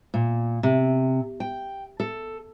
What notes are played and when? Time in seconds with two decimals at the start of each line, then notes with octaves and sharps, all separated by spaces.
0.14 A#2
0.63 C3
1.40 G5
2.00 A4